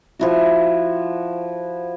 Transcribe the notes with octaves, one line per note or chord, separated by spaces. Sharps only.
F3 E4 F#4